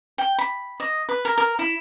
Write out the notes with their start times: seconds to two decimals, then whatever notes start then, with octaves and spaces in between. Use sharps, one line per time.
0.18 G5
0.38 B5
0.80 D#5
1.09 B4
1.25 A#4
1.38 A#4
1.59 E4